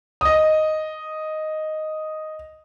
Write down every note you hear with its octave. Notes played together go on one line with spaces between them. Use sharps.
D#5 D#6